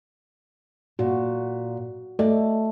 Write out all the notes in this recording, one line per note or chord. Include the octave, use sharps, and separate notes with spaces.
A#2 F#4
A3 D5 D#5